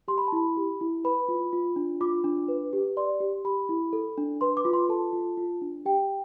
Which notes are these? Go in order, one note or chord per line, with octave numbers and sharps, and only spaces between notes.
G4 C6
B5
A5
E4 B5
G4
E4
B4 B5
F4
F4
D4
F4 D6
D4
B4
G4
D5 C6
G4
G4 B5
E4
A4
D4
B4 C6
D6
F4
C6
A4 A5
F4
F4
D4
G4 G5